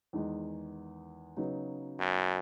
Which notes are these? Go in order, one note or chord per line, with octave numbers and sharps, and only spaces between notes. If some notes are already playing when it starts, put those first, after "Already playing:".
E2 D#3 G#3 D#4
C#3 F#3 B3 D#4
F#2